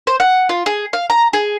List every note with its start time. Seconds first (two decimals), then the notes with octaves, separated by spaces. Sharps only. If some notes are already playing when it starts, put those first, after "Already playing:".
0.07 C5
0.20 F#5
0.49 F4
0.66 G#4
0.93 F5
1.10 A#5
1.33 G#4